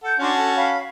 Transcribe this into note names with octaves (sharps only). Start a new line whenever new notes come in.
A4 F#5 G6
C#4 D4 F#4 A5 C6
A4
C#5 F5 B5